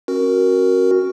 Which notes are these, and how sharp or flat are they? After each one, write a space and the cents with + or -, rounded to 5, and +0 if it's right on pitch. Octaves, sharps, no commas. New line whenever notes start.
C#4 -45 F#4 +5 A#4 +0